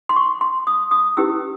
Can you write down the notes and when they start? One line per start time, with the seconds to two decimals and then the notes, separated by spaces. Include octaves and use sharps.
0.09 C6
0.16 C#6
0.41 C6
0.67 D#6
0.91 D#6
1.17 C#4 E4 G4 B4 E6